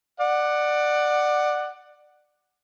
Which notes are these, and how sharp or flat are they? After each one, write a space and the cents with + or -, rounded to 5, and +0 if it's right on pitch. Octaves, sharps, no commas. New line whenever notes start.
D5 +20 F#5 +0